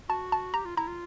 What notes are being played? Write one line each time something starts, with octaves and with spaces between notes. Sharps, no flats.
F#4 A5
A5
G4 A#5
F4
E4 A#5
F4